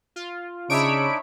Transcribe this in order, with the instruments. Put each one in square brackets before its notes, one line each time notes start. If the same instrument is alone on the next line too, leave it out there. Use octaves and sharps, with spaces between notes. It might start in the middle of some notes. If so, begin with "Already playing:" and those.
[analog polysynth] F4
[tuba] C#3 [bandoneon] D4 D#4 [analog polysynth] C#5 E5 B5 [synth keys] D7